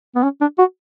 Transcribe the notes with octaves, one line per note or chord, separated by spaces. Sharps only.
B3
C#4
D4
F#4